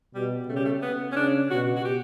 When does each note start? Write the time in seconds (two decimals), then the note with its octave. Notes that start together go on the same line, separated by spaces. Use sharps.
0.15 B2 G3
0.48 C#3 A3
0.56 G3
0.65 A3
0.82 B3
1.12 C#4
1.16 C#3 D4
1.51 B2 F#4
1.77 F#4
1.85 G4